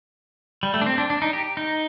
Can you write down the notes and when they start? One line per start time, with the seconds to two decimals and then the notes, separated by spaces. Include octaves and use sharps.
0.63 G3
0.74 A3
0.81 D4
0.86 C4
0.98 D4
1.10 D4
1.22 D#4
1.33 G4
1.57 D#4